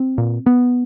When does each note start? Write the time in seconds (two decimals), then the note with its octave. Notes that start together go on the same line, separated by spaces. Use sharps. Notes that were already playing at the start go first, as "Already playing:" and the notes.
Already playing: C4
0.18 A#2
0.46 B3